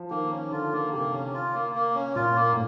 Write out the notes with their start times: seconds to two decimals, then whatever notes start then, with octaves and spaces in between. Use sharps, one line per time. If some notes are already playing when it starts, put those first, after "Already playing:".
Already playing: F3
0.10 D#3 A#3
0.32 C#4
0.52 D3 F4
0.73 A#3
0.93 C3 A#3
1.13 C#4
1.34 F4
1.54 A#3
1.75 A#3
1.95 C#4
2.16 A#2 F4
2.36 A#3
2.53 A2